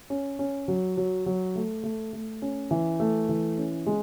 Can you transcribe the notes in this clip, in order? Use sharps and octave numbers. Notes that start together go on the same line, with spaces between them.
C#4
C#4
F#3
F#3
F#3
A3
A3
A3
C#4
E3
A3
E3
C#4
G#3